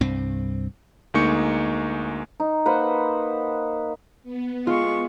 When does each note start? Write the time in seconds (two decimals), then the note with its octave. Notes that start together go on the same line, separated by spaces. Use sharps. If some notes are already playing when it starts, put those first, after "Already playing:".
0.01 C2 G2 C4
1.14 D2 G#3 A#3 D#4 C#6 C#7
2.40 D#4
2.66 A#3 B4 C5 F#5
4.23 B3
4.67 G#3 F4 C#6